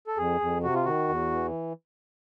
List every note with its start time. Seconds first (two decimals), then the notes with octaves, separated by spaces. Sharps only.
0.07 A4
0.17 F2 G#4
0.41 F2
0.63 C3 F#4
0.74 F4
0.85 D#3 F#4
1.09 E2
1.31 E3